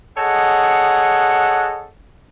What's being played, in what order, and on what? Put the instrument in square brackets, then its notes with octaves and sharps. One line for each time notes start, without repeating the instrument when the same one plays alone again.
[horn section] G#4 A4 C#5 D#5 F#5